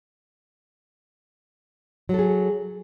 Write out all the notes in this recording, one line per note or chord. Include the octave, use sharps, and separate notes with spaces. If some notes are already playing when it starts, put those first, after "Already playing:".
F#3 G#4 A4